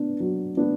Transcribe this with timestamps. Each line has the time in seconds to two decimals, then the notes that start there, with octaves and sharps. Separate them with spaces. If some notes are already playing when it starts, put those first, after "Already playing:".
Already playing: B3 D4
0.20 F#3
0.57 B3 D4